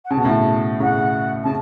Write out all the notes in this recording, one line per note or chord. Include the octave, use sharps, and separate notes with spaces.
F#5
C#3 A5
B2
A2 C#3
A2 C#3 F#5
A5
C#3